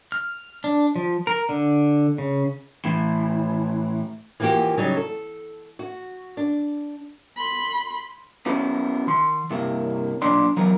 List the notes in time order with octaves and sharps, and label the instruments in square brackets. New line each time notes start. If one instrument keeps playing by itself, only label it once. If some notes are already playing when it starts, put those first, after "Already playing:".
[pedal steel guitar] F6
D4
F3
A#4
D3
C#3
[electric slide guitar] A2 E3
[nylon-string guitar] E3 F3 A#3 F#4 G4
C#3 F#3 G3 D#4
A4
F#4
D4
[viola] B5 C6
[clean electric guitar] B3 C#4 E4 F#4 B4
D#3 C6
G2 C3 A#3 E4
B1 A#2 D4 D5 C6
E2 F#3 B3 E4 A#4